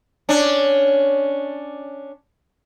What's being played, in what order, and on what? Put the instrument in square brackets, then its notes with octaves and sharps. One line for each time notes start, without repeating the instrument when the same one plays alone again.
[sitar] C#4 D4